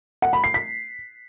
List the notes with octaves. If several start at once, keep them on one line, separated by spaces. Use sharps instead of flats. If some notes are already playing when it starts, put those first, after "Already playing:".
F#5
B5
C7
B6